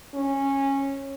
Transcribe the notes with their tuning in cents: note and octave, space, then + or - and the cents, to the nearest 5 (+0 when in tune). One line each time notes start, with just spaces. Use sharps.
C#4 -15